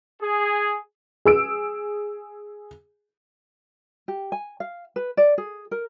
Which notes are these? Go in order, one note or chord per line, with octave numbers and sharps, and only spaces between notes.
G#4
G#4 E6 D7
G4
G#5
F5
B4
D5
G#4
A#4